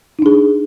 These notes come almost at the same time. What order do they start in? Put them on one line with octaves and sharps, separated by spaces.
D#4 D4 G#4